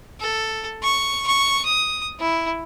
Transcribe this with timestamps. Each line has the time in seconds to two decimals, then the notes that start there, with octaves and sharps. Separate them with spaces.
0.20 A4
0.83 C#6
1.28 C#6
1.65 D#6
2.20 E4